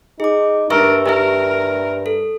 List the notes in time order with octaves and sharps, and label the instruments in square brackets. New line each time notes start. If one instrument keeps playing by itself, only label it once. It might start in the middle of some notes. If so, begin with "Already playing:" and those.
[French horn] D#4 [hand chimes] G#4 D6
[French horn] G2 [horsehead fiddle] D4 A#4 [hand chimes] E5 C#6 E6
[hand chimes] G4 E5 [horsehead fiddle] A#4
[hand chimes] A4